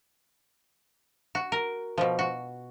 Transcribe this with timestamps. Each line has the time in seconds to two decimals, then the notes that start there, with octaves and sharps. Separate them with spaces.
1.35 F#4
1.52 A#4
1.98 B2 F3
2.19 F#4